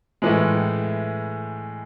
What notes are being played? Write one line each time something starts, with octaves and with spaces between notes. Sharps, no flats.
A2 E3 G#3